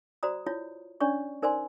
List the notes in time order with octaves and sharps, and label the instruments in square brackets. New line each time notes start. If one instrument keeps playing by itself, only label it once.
[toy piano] F#4 C5 D5 A#5 D#6
E4 F4 C#5
C#4 D4 C#5 D5 C#6
D#4 A#4 C5 D5 G#5 C6